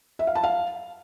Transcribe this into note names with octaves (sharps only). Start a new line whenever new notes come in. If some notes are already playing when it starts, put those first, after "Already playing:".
E5
F5
A5
F5